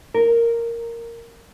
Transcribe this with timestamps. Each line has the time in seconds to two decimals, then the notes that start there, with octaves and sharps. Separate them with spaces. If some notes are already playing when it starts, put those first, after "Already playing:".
0.14 A#4